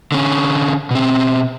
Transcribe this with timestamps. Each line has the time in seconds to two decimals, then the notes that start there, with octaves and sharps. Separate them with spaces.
0.12 D3 C#4
0.91 B2 C4